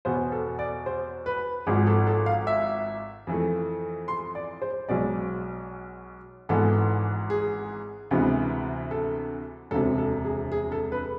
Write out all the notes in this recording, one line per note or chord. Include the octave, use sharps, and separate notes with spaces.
E2 B2 B3 C5
A4
D5
C5
B4
G#1 G#2 F3 G#4
A4
A4
F5
E5
F2 E3 A3
C6
D5
C5
B1 B2 G#3 D5
G#1 G#2 E3 B3 A4
G#4
D2 C3 E3 G#3 B3
A4
E1 D2 C3 A4
A4
G#4
G#4
A4
B4